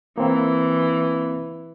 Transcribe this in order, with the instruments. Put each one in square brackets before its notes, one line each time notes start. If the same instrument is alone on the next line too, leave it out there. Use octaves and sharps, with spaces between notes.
[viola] E3 [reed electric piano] A#3 C4